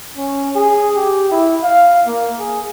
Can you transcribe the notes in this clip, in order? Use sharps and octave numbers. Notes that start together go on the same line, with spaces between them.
C#4
G#4
G4
E4
F5
A#3
G#4